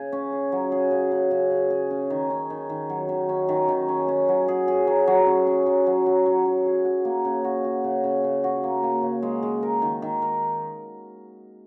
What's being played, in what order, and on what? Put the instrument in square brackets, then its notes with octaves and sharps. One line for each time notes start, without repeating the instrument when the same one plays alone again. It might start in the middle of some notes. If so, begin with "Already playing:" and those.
Already playing: [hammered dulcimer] C#3 G#4
C#4
G#4
F#3
G#4
C#3
C#3
C#3
C#3
G#4
C#4
D#3
C#4
D#3
D#3
F#3
D#3
C#4
D#3
D#3
C#4
C#4
F#3
G#4
G#4
F#3
F#3
C#4
C#4
F#3
F#3
F#3
F#3
F#3
G#4
F#4
A#3
C#3
F#4
F#4
C#3
C#3
C#3
F#4
A#3
A#3
C#3
G#3
G#3
A#4
D#3
D#3
A#4